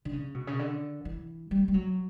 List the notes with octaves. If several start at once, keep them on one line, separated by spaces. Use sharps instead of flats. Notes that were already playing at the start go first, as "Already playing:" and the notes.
D3
C#3
B2
C#3
D3
E3
G3
G3
F#3